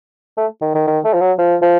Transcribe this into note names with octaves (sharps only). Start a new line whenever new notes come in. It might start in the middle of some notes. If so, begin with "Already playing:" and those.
A3
D#3
D#3
D#3
A3
F3
F#3
F3
F3